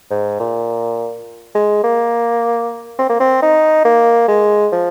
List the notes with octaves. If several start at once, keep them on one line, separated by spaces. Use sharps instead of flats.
G#2
A#2
G#3
A#3
C4
A#3
C4
D#4
A#3
G#3
F3